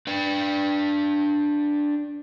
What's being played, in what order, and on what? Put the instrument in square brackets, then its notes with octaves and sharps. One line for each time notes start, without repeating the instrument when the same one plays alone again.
[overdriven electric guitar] D4 B4